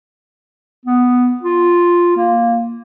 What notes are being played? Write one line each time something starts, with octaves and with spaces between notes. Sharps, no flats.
B3
F4
A#3